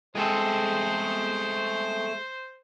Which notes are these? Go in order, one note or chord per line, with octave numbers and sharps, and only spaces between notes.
G#3 A3 C4 G#4 A4 C5